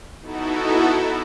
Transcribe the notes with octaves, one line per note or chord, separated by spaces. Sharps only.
B3 D#4 E4 F#4 A4